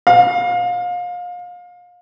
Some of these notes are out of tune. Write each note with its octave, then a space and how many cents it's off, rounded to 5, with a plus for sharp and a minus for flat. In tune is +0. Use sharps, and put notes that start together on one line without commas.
F5 +30